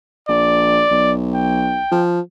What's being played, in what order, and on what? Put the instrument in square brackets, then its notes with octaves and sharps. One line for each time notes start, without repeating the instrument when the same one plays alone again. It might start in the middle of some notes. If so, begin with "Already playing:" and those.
[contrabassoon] A#1 [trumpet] D5
[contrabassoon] B1
[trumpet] G5
[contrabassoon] F3